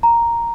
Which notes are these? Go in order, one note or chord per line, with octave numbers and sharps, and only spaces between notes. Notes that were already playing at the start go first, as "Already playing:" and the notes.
A#5